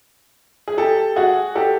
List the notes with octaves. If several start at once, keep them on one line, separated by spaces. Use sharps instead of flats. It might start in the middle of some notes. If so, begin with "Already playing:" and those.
G#4
G4 A4
F#4 G#4
G4 A4